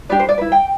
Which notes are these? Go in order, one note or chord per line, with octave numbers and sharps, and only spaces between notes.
D4 G4 B4 D5
C5
D5
E4 B4
G5